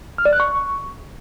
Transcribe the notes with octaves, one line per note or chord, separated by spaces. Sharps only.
F6
D5
F#6
C#6